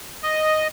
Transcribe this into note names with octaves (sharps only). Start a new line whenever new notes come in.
D#5